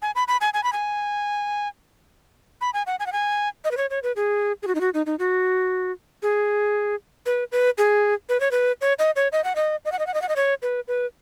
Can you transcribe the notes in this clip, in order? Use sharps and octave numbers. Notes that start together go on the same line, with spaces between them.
G#5
B5
B5
G#5
G#5
B5
G#5
B5
G#5
F#5
G#5
F#5
G#5
D#5
B4
C#5
C#5
B4
G#4
G#4
F#4
D#4
F#4
D#4
D#4
F#4
G#4
B4
B4
G#4
B4
C#5
B4
C#5
D#5
C#5
D#5
F#5
D#5
D#5
F#5
D#5
F#5
D#5
F#5
D#5
C#5
B4
B4